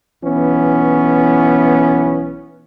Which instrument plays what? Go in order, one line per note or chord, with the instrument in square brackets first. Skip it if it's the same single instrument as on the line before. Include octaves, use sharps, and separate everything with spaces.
[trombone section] B1 E3 B3 C#4